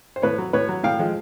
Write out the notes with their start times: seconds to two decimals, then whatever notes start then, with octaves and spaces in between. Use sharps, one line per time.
0.16 C5
0.22 A2 B4 C#5
0.38 F#3
0.53 A2 B4 C#5
0.69 F#3
0.83 A2 F5 G5
0.99 F3 G#3